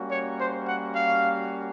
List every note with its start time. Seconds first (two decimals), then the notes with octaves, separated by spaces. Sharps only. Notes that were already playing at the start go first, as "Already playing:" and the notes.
Already playing: G3 A#3 C#4 F#4
0.10 C#5
0.38 C5
0.67 F#5
0.95 F5